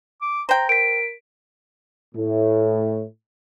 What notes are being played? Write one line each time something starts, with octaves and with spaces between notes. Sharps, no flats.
D6
C5 G5 A#5
A#4 B6 D7
A2